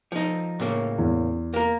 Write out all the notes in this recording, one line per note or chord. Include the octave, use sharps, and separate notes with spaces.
F3 D#4
A2 C#3 A#3
E2
A#3 A#4